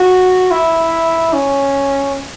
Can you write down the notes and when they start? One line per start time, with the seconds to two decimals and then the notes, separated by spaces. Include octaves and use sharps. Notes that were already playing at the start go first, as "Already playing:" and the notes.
Already playing: F#4
0.51 E4
1.33 C#4